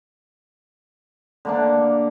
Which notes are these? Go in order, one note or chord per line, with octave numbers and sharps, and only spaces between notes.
D3 A#3 D4